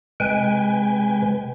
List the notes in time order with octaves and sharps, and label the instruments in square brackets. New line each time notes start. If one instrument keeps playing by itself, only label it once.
[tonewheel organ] C3 G#3 B4 G5 G#5